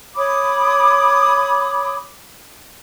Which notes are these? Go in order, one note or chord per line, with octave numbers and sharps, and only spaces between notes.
C#5 B5 D6 D#6